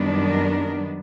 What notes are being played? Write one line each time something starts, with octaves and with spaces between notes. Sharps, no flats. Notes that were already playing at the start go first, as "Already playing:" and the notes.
Already playing: F#2 D#3 G3 B3 D4
A#4